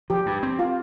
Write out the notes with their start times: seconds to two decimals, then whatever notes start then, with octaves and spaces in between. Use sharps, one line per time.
0.10 F3 G4
0.26 G2
0.43 C4
0.59 F4